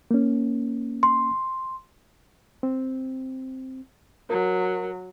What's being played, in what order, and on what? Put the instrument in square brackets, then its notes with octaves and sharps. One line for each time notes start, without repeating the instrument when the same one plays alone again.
[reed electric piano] A#3 C#4
[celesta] C6
[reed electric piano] C4
[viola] F#3 [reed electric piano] A#4